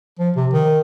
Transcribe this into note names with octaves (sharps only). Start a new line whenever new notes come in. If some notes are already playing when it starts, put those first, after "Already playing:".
F3
C3
D#3